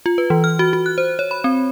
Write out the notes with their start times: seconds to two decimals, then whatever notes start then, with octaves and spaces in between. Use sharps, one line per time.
0.06 F4
0.18 B4
0.30 E3
0.44 F6
0.59 F#4
0.73 F#4
0.86 F#6
0.98 C5
1.19 C#5
1.31 B5
1.44 C4